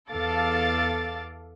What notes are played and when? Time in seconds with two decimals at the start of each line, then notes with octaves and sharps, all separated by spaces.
0.10 E2 A4 F5 D6 A6